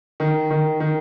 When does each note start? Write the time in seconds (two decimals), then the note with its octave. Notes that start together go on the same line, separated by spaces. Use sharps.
0.20 D#3
0.50 D#3
0.80 D#3